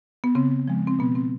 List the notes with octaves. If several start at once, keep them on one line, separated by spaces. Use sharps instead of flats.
B3
C#3 C4
F3 G#3
C4
B2 B3
C4